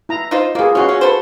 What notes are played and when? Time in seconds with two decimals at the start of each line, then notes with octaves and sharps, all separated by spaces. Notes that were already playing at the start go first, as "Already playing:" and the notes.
0.09 E4 A#5
0.31 D#4 F4 C5
0.55 A#3 B3 F4 G#4
0.75 B2 C#4 E4 F#4 C6
0.89 C#4
1.01 A4 B4 C5